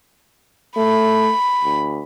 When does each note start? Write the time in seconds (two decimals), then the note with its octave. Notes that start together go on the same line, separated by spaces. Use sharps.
0.77 A3 B5
1.64 D2